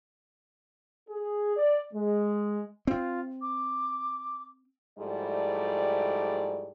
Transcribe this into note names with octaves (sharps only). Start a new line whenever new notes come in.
G#4
D5
G#3
C4 F4
D6
G#2 F3 G3 A3 E4 D5